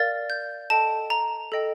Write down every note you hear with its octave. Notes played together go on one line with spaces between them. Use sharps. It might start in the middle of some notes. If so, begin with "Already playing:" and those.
Already playing: A#4 D5 F5 A6
G6
A4 D#5 G5 A5
A#5
A4 D#5 G5